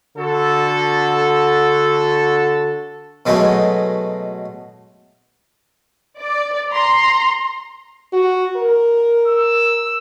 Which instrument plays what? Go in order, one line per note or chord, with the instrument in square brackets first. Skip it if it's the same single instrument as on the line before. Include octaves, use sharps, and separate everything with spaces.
[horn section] D3 F#4 A4
[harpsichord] B2 F#3 G#3 A3
[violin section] D5
A#5 C6
[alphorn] F#4
A#4
[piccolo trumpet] E6